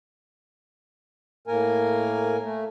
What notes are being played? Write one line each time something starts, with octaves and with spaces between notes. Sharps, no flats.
A2 A#3 A#4 G#5
A3